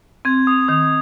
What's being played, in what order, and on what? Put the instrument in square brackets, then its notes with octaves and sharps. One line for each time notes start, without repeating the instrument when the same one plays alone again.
[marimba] C4 [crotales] G#6
[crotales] D#6
[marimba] D#3 [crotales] D#6